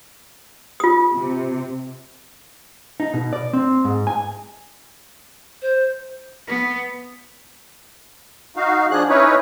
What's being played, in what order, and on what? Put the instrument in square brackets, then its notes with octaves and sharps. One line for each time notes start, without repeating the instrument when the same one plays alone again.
[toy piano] F4 D#6
[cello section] C3
[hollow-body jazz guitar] D#4
B2
D5
C4
G#2
G#5
[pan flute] C5
[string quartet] B3
[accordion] D#4 F#4 F5
F3 D4 G#4 F#6
C#4 D#4 E4 B4 C#5